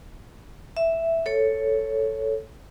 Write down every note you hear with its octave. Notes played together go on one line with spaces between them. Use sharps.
E5
A4 C#5